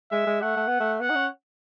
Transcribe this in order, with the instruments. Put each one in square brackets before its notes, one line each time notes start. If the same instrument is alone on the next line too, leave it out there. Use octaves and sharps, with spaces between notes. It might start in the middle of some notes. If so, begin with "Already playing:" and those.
[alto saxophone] G#3 [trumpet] E5
[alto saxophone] G#3
[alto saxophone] A3 [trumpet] F#5
[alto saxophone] A3
B3
A3
[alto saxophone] B3 [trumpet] F#5
[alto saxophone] D#4
C#4